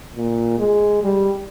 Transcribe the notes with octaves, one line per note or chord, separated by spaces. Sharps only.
A#2
G#3
G3